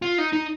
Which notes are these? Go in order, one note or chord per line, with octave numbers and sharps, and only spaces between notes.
F4
D#4
D#4